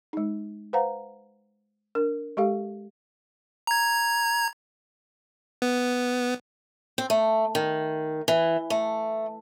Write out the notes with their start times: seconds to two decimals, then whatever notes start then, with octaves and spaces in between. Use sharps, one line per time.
0.13 G#3 D#4
0.73 B4 C5 F5 F#5 A#5
1.95 D4 A#4
2.37 G#3 G4 A4 F5
3.67 A#5 G#6
5.62 B3
6.98 C4
7.10 A3
7.55 D#3
8.28 E3
8.70 A3